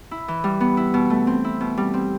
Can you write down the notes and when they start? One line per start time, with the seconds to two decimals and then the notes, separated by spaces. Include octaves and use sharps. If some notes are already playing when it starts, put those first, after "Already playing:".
0.11 E4
0.28 E3
0.44 G3
0.60 B3
0.77 E4
0.94 B2
1.10 A3
1.27 C4
1.44 E4
1.61 B2
1.77 G3
1.94 C4